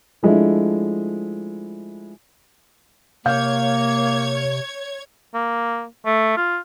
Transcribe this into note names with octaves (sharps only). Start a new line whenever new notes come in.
F3 G#3 A3 D4 E4
C3 A#3 C#5 F5 G6 G#6
A#3
A3
F4